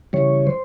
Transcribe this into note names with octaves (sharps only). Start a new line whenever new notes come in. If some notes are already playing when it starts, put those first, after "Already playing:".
C#3 E3 G3 C#5
C5